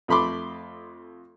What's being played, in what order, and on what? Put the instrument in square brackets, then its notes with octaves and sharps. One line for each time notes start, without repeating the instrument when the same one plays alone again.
[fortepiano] F2 A3 B5 C6 D6